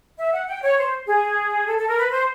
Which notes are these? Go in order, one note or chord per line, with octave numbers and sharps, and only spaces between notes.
E5
F#5
G5
C#5
C5
G#4
A4
A4
A#4
B4
C5